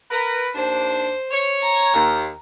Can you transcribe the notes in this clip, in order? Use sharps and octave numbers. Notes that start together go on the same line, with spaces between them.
A#4 B4
D#2 D4 C5
C#5
A#5
D#2